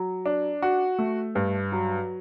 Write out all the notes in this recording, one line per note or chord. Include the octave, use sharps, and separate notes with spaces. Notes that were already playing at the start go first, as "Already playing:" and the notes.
Already playing: F#3
D4
F#4
A3
G2
F#3